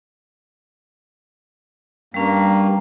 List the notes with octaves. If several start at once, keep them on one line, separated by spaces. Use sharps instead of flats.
G2 G3 A#3 C#4